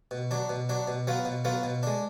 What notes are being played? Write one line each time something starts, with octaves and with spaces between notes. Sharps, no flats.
B2
F#3 D4
B2
F#3 D4
B2
F#3 B3 F4
B2
F#3 B3 F4
B2
G#3 D4